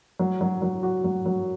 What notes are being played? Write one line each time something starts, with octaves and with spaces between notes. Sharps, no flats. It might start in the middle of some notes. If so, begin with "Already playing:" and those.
F#3
F#3
F#3
F#4
F#3
F#3